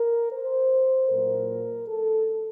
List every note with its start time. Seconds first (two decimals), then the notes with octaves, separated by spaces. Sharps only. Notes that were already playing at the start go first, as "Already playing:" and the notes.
Already playing: A#4
0.33 C5
1.09 A#2 F#3 A#3 A#4
1.87 A4